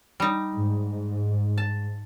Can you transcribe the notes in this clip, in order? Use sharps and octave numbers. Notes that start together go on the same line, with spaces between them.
G3 D#4
G#2
A5